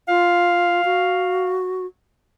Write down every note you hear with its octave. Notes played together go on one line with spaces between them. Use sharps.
F4 F5
F#4